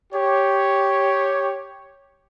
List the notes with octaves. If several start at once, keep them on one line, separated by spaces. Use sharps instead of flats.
G4 C#5